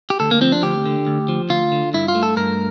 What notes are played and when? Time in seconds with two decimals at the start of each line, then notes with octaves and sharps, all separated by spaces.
0.10 G4
0.20 D2 A4
0.31 A#3
0.41 F3 C4
0.52 D4
0.63 D2 G4
0.86 D3
1.07 D2
1.28 F3
1.49 D2 F4
1.72 D3
1.94 G2 E4
2.08 F4
2.15 A3
2.23 A4
2.37 G2 A#4